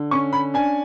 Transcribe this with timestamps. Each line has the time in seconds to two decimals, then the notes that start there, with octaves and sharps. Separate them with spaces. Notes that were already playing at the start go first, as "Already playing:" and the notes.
Already playing: D3
0.11 C#4 C#6
0.33 B5
0.54 D4 G#5